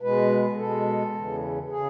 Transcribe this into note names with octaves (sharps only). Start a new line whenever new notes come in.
B2 G#3 B4
B2 G#3 A4
E2 C#3 E3
C#3 G#4